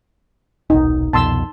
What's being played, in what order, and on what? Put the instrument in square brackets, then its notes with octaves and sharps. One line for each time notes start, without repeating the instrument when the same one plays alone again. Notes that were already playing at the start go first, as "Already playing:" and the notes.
[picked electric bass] D#1 B1 [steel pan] D#4
[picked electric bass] C2 F2 B2 [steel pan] A5 C6 E6